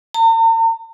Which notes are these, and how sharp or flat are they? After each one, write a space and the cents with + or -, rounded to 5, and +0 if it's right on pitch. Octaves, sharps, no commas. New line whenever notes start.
A#5 -45